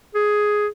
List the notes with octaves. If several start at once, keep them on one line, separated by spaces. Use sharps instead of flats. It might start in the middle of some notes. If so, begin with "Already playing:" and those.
G#4